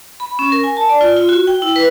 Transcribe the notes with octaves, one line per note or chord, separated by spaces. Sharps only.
B5
C#4
A#4
G#5
A5
D5
F4
F4
F#4
G5
E4
B4